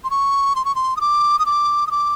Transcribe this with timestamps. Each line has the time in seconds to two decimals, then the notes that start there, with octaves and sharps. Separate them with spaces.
0.04 C6
0.10 C#6
0.56 C6
0.65 C#6
0.75 C6
0.97 D#6
1.01 D6
1.39 D#6
1.46 D6
1.87 D#6
1.91 D6